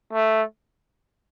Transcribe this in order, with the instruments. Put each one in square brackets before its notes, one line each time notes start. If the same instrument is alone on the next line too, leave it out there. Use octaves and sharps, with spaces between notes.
[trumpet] A3